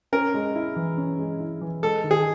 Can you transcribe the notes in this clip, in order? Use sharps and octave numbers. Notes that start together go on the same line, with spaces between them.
C#4 A#4
G#3
E4
E3
C#4
G#3
E4
E3
G#3 A4
D#3
G#4